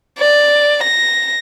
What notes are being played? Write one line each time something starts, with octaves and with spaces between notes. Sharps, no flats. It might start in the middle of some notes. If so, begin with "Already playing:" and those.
D5
A#6